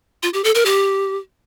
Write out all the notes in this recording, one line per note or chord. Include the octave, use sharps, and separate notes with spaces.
F4
G4
A4
A#4
G4